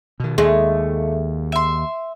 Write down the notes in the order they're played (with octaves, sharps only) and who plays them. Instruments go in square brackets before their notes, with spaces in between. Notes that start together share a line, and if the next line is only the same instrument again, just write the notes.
[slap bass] B2 D#3
[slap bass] D#2 [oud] G#3 [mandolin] A3
[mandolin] E5 C6